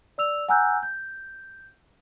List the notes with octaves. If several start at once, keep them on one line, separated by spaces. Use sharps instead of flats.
D5 E6 F7
F#5 G#5 A#5 E6 F#6 G6
G6